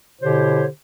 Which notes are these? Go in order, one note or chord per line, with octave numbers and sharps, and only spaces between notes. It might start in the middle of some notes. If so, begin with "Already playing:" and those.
B2 D3 E4 G4 C5 C#5